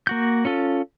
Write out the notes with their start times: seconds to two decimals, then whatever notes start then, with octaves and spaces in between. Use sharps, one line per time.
0.07 A#3 F#4 G6
0.45 C#4 F4 A4